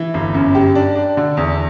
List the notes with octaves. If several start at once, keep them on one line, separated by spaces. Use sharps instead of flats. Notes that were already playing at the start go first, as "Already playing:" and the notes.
Already playing: E3
G1
F#2
G4
D4
D4
D3
E2